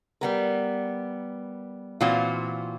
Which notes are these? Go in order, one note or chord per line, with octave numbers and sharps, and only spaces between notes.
G3 B3 A#4
A#2 E3 C4 F4 F#4